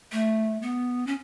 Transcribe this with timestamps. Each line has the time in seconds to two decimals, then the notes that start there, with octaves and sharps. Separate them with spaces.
0.12 A3
0.62 B3
1.07 C#4